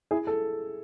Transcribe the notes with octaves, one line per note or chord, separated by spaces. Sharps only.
E4 G#4
A4